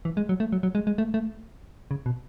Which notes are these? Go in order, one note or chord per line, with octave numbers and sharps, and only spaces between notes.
E3
G#3
F#3
A3
F#3
F#3
G#3
G#3
A3
A3
C#3
B2